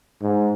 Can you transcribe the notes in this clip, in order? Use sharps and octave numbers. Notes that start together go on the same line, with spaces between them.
G#2